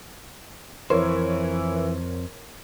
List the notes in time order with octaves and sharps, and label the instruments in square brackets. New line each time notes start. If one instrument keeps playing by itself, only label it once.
[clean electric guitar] F2 C5 [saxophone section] E3 [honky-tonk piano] A#4 C#5